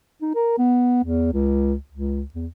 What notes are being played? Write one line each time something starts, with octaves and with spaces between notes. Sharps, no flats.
D#4
A#4
B3
E2
C#2
C#2
E2